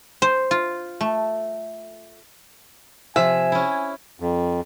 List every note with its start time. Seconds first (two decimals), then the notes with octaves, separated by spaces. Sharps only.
0.22 C5
0.51 F4
1.01 A3
3.16 C3 F3 E5 G#5
3.52 C#4 E4
4.20 F2